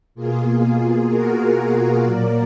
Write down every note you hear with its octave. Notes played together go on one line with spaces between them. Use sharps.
B2 A#3 F4 G#4
F#4 A#4
A#2 F#3 A#3 A#4 D5